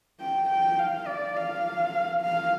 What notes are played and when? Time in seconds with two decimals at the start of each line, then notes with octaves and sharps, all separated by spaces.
0.20 G5
0.50 G5
0.79 F5
1.07 D5
1.36 F5
2.22 F5